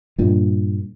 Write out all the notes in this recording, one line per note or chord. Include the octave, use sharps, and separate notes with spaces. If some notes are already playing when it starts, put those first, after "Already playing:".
G2 A#2